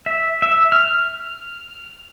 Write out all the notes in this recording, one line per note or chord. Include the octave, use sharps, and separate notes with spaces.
E5
E5
F6